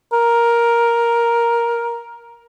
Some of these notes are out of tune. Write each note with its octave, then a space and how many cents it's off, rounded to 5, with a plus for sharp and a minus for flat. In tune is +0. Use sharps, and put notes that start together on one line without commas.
A#4 +10